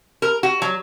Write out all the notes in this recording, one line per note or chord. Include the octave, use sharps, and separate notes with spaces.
A#4
F#4
F#3